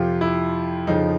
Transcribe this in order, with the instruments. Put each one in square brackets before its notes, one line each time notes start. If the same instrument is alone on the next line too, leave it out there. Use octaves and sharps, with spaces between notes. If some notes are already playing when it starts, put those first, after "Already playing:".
Already playing: [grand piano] F2 C3 F3 F4 G4
E4
F2 C#3 F3 D#4